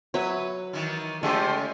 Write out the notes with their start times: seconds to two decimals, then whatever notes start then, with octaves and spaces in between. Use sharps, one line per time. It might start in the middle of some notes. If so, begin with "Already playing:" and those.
0.14 F#3 B4 C#5 E5
0.73 D#3 E3
1.23 C#3 F3 G#3 A3 G4 C5